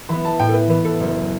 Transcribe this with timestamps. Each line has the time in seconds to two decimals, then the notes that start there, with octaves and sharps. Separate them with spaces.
0.09 E3 B3 B5
0.25 A5
0.39 A2 G5
0.49 A4
0.54 B4
0.69 E3 B3 B4
0.85 A4
1.00 F#1